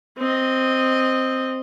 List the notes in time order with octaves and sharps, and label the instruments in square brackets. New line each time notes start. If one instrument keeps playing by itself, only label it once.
[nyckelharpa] C4 D#5